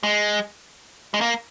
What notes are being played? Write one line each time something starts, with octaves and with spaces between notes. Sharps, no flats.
G#3
G#3
A#3